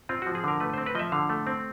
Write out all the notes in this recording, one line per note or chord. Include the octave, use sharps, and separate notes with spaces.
C4 F4
F#4
F3
G#4
D3 A#4
A3 B4
C5
C4
B4
F3 D#5 E5
D3 F5
A3
C4